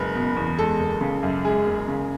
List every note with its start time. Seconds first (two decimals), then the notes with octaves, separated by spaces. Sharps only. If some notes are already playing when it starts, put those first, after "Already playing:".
Already playing: F#1 G#3 B4
0.15 B2
0.37 E2
0.58 G#3 A4
0.80 F#1
1.01 C#3
1.23 F#2
1.44 G#3 G#4
1.66 F#1
1.88 C#3